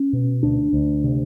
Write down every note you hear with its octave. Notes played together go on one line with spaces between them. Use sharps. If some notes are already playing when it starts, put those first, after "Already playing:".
Already playing: C#4
B2
D2 D4
D2
C3